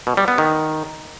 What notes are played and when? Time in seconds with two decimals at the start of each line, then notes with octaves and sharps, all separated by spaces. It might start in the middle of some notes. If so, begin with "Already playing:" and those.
0.07 B2
0.17 G3
0.28 B3
0.38 D#3